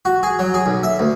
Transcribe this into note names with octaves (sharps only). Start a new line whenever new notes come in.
F#4
G#4
F#3
G#4
B1
E5
D2